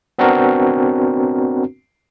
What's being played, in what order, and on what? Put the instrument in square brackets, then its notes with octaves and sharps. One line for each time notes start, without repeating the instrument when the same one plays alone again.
[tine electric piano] B3 C4 D4 F#4 A#4